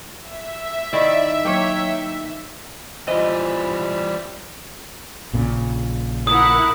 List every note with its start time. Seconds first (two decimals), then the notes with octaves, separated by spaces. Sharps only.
0.19 E5
0.93 D#3 E4 D5
1.45 F#3 A#3 C#5 G5
3.08 E3 G3 F4 C5 D#5
5.33 A#1 A#2 C#3
6.27 E4 A#4 F#5 D#6